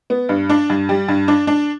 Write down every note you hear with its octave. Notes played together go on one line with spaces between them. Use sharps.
B3
G2
D4
G2
G3
G2
D4
D4